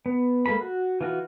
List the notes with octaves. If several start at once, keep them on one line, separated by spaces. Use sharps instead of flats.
B3
G#3 A#3 A4 B4 B5
F#4
E3 F4 F#4